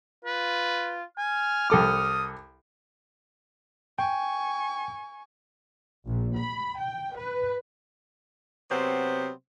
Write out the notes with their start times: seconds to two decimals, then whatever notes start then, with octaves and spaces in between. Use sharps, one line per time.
0.25 F4 B4
1.18 G#5 F6
1.70 C2 A4 D6 D#6
3.99 G5 G#5 C#6
6.07 A#1
6.35 B5
6.77 G5
7.15 B4
8.71 C3 F#3 B3 C4 C5